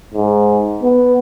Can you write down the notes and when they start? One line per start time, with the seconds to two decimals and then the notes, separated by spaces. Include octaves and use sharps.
0.14 G#2
0.83 B3